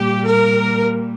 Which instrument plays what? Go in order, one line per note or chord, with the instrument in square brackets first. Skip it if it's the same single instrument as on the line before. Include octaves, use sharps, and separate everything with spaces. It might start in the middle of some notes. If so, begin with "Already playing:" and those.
Already playing: [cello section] A#2 G3 G4
A#4